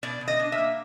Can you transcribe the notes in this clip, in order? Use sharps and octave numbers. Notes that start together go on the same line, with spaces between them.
B2 D5
B2
D#5
D4
E5
A#3